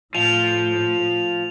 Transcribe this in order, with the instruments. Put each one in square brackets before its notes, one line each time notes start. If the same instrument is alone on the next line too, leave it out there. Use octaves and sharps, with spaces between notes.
[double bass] A2 [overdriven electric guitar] F3 [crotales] F7